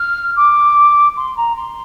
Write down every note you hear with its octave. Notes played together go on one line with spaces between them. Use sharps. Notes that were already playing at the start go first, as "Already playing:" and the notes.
Already playing: F6
D6
C6
A#5
C6